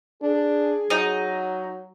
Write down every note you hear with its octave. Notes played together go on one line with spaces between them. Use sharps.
D4 G#4
F#3 D#4 D#5